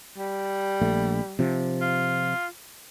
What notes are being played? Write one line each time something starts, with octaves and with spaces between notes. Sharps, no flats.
G3
A#1 A3
C3 F3
F4